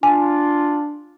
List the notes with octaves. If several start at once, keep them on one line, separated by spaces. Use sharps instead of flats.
D4 F4 G#5